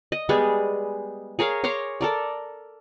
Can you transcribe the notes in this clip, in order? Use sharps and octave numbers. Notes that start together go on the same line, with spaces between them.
D#5
G3 G#3 B3 G#4
G#4 A#4 C#5 F5
C#5 A#5 C6 D6
A4 A#4 D5